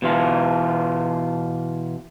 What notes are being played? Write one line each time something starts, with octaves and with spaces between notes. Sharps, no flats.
B2 E3 F4